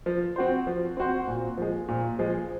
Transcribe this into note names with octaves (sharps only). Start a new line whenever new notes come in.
F3
C4 F#4 C5
F3
C4 F#4 C5
A#2
F3 G#3
A#2
F3 G#3